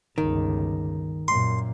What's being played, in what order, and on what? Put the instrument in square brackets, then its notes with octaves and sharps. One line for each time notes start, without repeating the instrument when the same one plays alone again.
[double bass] G1 C#2 [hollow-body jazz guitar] D#3
[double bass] F#2 A#2 [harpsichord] C6